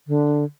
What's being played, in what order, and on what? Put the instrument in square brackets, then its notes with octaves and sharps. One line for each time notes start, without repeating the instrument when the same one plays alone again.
[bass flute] D3